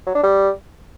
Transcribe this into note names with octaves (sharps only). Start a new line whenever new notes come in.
F#3
D4
G3